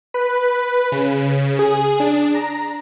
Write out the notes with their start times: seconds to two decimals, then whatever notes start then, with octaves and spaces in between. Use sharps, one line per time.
0.14 B4
0.92 C#3
1.59 G#4
2.00 D4
2.35 A#5